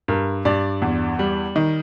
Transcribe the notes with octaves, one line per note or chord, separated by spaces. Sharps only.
G2 A#4
G2 D5
E2
G3
D#3